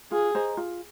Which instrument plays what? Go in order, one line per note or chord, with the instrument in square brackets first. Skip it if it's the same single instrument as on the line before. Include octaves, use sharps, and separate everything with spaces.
[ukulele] F4 [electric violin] G#4
[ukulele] C5 D#5 A#5
F4